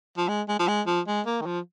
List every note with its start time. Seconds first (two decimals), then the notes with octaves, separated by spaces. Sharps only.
0.17 F3
0.28 G#3
0.48 G#3
0.59 F3
0.68 G#3
0.87 F3
1.07 G#3
1.26 A#3
1.41 D#3
1.46 F3